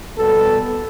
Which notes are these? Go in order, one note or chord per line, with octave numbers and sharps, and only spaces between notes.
B2 G3 B3 A4